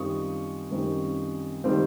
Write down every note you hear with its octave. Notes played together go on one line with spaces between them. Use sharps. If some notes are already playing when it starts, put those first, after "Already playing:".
Already playing: F#2 D#3 G3 C4 F4 C#6 D#6
F#2 D#3 G3 C4 F4
D#3 G3 C4 F4